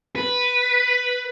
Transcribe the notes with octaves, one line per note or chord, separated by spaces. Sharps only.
B4